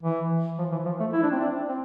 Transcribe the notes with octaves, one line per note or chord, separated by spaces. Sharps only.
E3
F3
E3
F3
A3
E4
D4
C4
D4
C4